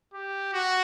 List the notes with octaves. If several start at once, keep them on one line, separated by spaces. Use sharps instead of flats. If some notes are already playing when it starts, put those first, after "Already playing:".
G4
F#4